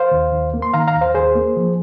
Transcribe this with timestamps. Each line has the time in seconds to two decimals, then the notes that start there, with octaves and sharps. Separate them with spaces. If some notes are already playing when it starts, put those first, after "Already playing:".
Already playing: C5 F5
0.11 D#2
0.32 D#2
0.54 A#3
0.62 C6
0.74 D#3 F5 A#5
0.88 F5 A#5
0.94 D#2
1.01 C5 F5
1.14 D#2 G#4 C5
1.35 A#3
1.56 F3